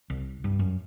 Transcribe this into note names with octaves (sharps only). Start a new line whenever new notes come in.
C2
G2
F#2